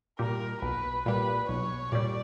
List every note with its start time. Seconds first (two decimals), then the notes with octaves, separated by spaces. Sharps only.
0.19 A#2 G3 A#4
0.62 B1 B4
1.06 A#2 G3 B4
1.49 B1 C#5
1.92 A#2 G3 D5